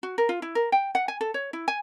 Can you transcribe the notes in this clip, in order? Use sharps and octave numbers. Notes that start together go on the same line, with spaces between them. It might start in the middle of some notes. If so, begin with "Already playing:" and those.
F#4
A#4
F4
E4
A#4
G5
F#5
G#5
A4
C#5
E4
G#5